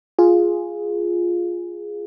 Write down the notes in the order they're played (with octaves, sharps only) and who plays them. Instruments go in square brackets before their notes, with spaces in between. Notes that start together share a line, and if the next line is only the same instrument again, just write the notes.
[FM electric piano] F4 G#4